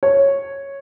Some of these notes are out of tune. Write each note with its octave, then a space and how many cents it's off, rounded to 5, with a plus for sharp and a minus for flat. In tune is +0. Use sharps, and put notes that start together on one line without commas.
C#5 -5